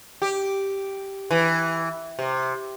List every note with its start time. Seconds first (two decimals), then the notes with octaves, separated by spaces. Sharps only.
0.22 G4
1.31 E3
2.19 C3